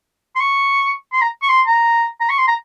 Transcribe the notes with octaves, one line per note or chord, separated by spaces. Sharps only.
C6
C#6
C6
A#5
C#6
C6
A#5
A#5
C#6
C6
A#5